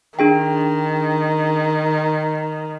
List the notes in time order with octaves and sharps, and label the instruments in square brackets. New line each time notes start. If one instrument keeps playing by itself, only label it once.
[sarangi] D#3 [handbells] D4 G#4 G5